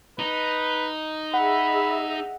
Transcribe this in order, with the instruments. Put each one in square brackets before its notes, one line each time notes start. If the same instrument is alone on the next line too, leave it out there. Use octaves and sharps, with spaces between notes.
[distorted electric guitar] D#4 [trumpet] B4
[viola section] G#4 D#5 E5 [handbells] F#5 [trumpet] B5